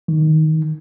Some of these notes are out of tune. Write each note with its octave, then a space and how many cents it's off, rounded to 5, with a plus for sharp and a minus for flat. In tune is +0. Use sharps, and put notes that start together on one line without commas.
D#3 +10